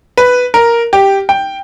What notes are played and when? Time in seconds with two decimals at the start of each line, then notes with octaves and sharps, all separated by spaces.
0.17 B4
0.54 A#4
0.93 G4
1.29 G5